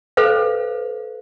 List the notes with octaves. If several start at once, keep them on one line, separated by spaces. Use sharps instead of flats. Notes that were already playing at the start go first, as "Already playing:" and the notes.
A4 B4 C5 F5